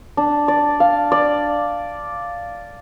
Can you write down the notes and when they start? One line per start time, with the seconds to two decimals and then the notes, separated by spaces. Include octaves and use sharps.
0.17 D4
0.48 D5
0.80 F5
1.12 D5